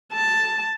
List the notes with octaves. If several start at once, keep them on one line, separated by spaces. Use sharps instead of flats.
A5